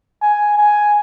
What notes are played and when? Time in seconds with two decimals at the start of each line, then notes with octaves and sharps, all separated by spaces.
0.22 G#5
0.58 G#5